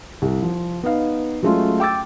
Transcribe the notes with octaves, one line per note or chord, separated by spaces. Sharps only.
C2
F3
B3 D#4 F5
F#3 G#3 A3 C#4 F4
G5 D6 E6 A6